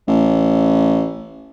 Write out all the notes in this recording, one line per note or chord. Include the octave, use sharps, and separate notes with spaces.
A1